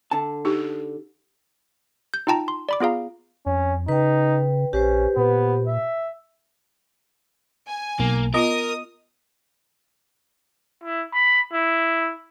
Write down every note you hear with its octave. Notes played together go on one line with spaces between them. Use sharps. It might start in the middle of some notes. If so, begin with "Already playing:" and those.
D3 A5
D#4 G4
G6
D#4 F4 G5 A5 A#5
C6
D5 B5 D6
B3 F4 G#4 F5 A#5
F2 C#4
C#3 D#4 B4 G5
A#1 C#4 G4 B4 C5
A#2 B3
E5
G#5
B1 A#3
B3 F4 A#4 D#5 D#6
E4
B5
E4